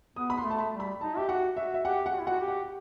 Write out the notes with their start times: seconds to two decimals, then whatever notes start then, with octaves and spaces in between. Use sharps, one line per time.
0.16 B3 D#6
0.30 B5
0.37 B3 C6
0.45 A3
0.50 A5
0.58 B5
0.73 G3
0.80 B5
1.01 D#4 A5
1.17 G4 E5
1.28 F#4 F#5
1.57 F#4 E5
1.74 E5
1.84 G4 F#5
2.06 F#5
2.13 F#4
2.20 E4
2.27 F#4 F#5
2.41 G4
2.48 F#5